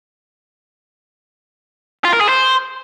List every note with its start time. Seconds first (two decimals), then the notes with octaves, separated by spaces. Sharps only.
2.05 F4
2.13 A#4
2.21 G#4
2.29 C5